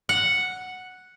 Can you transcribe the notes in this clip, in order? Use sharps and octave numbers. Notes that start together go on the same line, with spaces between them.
F#5